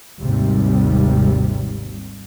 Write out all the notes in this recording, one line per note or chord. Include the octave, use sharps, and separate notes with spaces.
G#1 D#2 C3 G3